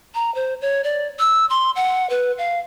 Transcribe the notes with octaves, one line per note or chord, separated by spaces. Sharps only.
A#5
C5
C#5
D5
E6
C6
F#5
B4
F5